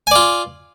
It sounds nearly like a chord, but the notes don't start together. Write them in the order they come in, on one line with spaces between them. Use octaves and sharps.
G#5 D5 F4